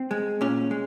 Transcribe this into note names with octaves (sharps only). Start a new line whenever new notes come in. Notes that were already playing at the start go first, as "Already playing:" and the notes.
Already playing: C4
G#3
A#2 C#4
G#3